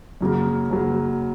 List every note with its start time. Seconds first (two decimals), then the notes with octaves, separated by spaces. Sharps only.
0.21 F#2 C#3 F#3 A#3
0.70 F#2 C#3 F#3 A#3